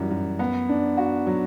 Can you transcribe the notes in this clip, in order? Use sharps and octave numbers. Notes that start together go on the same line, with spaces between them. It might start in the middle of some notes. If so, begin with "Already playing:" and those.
Already playing: F#2 E3 G3
F#2
B3
D4
F#4
F#3